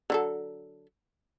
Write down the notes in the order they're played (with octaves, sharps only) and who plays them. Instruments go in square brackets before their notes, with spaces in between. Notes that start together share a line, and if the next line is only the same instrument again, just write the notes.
[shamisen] D3 F#3 A4